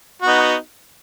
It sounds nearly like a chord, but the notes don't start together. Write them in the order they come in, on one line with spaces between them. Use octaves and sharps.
F#4 B3 D#4